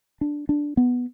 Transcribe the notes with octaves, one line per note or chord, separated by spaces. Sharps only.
D4
D4
B3